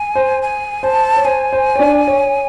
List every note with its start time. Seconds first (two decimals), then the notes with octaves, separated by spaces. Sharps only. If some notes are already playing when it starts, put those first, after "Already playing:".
Already playing: G#5
0.15 C5
0.43 G#5
0.83 C5 A5
1.17 C#5
1.25 C5 G#5
1.53 C5
1.76 C#5
1.79 D4 D5
2.07 C#5